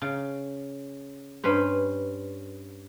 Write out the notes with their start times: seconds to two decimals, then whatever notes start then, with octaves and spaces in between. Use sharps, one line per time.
0.02 C#3
1.44 G2 C#4 B4 C5